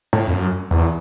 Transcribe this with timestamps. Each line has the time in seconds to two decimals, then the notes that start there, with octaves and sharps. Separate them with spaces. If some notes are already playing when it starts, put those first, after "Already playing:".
0.13 A2
0.28 F2
0.32 F#2
0.71 E2